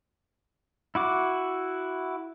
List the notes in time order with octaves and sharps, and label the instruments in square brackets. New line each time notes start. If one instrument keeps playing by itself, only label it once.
[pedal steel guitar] E4 F#4 D6